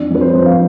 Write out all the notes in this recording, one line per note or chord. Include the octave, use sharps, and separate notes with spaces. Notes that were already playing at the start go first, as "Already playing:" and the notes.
Already playing: F2 D4
F2 B4
C5
F2
F5